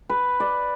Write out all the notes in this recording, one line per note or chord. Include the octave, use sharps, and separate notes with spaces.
B4
D5